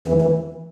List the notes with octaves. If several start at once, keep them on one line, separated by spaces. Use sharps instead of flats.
E2 E3
E3